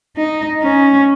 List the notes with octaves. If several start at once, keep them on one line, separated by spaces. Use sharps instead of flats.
D#4
C#4